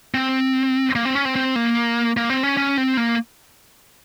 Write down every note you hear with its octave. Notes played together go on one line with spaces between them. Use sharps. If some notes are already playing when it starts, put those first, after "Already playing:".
C4
A#3
C4
C#4
C4
C4
A#3
A#3
C4
C#4
C#4
C4
A#3